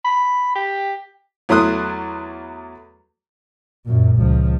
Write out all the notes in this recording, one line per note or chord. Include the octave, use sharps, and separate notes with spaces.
B5
G4
E2 F#3 A3 C6 D#6 F#6
F#2 A#2
C#2 F3